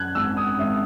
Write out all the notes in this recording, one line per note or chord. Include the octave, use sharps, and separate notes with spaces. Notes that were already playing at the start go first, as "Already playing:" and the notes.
Already playing: F#2 F#6 G#6
G#1 E6
D#6
G#1 E5